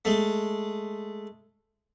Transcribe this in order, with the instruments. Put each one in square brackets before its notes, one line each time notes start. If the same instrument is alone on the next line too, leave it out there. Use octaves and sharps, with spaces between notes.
[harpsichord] G#3 A3